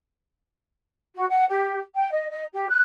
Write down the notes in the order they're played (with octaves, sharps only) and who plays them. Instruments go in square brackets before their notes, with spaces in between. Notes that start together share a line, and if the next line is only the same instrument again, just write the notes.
[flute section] F#4
F#5
G4
G5
D#5
D#5
G4
F#6